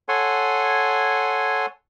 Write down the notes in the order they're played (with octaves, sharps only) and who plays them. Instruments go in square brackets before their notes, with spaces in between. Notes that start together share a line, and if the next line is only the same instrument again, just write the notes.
[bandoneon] A4 C#5 F#5 G#5 C6